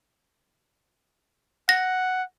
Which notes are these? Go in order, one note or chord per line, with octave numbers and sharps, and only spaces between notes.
F#5 A#6